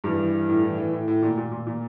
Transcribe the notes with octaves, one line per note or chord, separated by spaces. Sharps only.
G2 E3 G3
E3
E3
A2
E3
E3
A2
A2
A#2
A#2
A#2
A#2